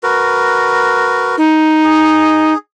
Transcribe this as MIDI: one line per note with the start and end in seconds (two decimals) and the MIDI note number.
0.03 1.36 66
0.03 1.36 70
0.03 1.36 71
1.38 2.53 63
1.84 2.58 68